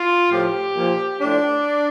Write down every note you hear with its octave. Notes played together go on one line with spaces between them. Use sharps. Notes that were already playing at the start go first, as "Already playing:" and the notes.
Already playing: F4
A2 F3 G4
A#2 F3
A2 F3 D4